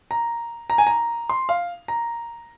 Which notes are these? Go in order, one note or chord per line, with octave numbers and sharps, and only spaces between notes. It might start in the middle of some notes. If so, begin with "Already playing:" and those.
A#5
A#5
G#5
A#5
C6
F5
A#5